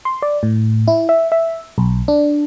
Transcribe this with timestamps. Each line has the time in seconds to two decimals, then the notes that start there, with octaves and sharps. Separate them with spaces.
0.05 C6
0.22 D5
0.43 A2
0.88 E4
1.09 E5
1.32 E5
1.78 B1
2.08 D4